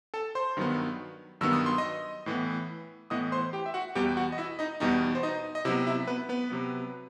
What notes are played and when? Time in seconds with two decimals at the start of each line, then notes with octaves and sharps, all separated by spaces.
0.14 A4 A5
0.35 C5 C6
0.57 G2 D#3 F#3 B3
1.41 G2 D#3 F#3 B3 E6
1.53 D#6
1.66 C6
1.78 D#5 D#6
2.26 A2 E3 B3
3.10 A2 E3 B3 D#5 D#6
3.32 C5 C6
3.53 G4 G5
3.66 E5
3.74 F#4 F#5
3.95 E2 B2 G3 B3 G4 G5
4.17 F#4 F#5
4.32 D#5
4.38 E4 E5
4.59 D#4 D#5
4.80 E2 B2 G3 B3 D#4 D#5
5.15 C5
5.23 D#4 D#5
5.55 D#5
5.65 C3 E4 E5
5.68 F#3 B3
5.87 E4 E5
6.07 B3 B4
6.29 B3 B4
6.50 C3 F#3 B3